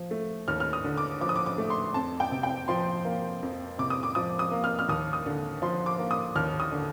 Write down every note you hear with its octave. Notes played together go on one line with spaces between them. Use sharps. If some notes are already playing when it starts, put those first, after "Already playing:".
Already playing: F3
A3
D#2 F6
F6
D#6
D3
D6
F3 D6
D#6
D6
D6
A3
C6
F2 A5
G5
C3
G5
F3 C6
A#3
F2
C3 D6
D#6
D6
F3 D#6
D#6
A#3
F6
F6
D#2 D#6
D#6
D3
F3 C6
D6
A#3
D#6
D#2 F6
D#6
D3